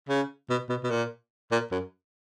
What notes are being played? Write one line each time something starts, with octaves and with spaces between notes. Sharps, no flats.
C#3
B2
B2
B2
A#2
A#2
F#2